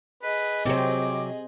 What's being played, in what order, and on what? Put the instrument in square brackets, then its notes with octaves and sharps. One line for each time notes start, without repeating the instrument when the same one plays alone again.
[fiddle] G#4 D#5 [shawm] B4
[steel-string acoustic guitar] C3 F#3 [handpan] C4 G4 C5 [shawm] D6